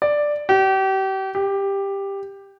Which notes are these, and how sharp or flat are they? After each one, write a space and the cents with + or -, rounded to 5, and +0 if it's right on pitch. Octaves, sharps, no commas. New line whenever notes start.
D5 +5
G4 -35
G4 +10